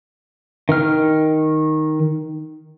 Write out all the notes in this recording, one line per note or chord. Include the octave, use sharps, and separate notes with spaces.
D#3 F6